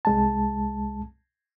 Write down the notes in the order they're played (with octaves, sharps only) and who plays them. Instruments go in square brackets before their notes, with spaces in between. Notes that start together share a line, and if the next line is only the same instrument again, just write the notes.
[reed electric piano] C2 G#3 A5